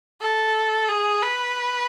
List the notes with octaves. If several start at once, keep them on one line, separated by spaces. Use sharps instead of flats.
A4
G#4
B4